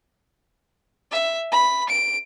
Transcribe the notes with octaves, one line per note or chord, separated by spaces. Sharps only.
E5
B5
D7